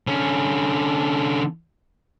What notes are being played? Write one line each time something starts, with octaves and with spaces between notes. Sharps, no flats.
D3 C#4